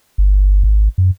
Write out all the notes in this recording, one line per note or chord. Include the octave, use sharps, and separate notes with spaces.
G1
G#1
F#2